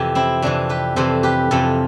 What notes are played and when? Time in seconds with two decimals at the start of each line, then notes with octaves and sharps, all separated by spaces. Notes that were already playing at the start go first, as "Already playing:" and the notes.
Already playing: F2 C3 E3 G4
0.15 C4 E4
0.42 F2 C3 E3 D4
0.69 G4 B4
0.96 F2 C3 E3 A4 C5
1.23 G4 B4
1.51 F2 C3 E3 F4 A4